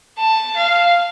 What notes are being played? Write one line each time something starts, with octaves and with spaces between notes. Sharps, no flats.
A5
F5